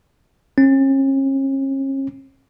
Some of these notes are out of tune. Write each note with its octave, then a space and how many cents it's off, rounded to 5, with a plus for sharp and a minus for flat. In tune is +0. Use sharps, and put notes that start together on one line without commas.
C#4 -40